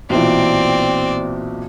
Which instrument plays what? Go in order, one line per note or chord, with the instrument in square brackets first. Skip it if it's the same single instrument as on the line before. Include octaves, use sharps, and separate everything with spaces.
[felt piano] B1 A#2 E3 [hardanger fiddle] C4 D5